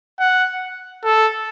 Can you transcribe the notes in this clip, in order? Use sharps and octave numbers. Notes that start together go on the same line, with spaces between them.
F#5
A4